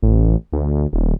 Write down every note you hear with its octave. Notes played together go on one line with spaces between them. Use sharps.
A1
D2
D#1